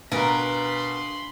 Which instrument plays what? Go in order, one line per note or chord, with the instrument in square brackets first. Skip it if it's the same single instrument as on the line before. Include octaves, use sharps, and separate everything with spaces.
[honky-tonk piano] B2 [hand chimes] D4 F5 G#5 [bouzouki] A#4 B4 [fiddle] B5 C6